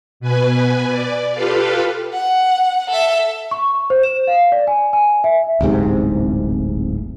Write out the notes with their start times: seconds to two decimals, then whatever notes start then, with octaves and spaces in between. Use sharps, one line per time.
0.20 B2 B4 G#5
0.89 D5
1.32 F4 G4 A4 B4 F5
2.12 F#5
2.89 A4 E5
3.51 C#6
3.90 C5
4.03 E7
4.27 F5
4.52 D5
4.67 G#5
4.93 G#5
5.24 E5
5.61 D1 G1 G#2 C3